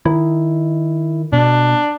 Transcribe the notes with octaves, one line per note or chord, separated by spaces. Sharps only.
D#3 E4
B2 D4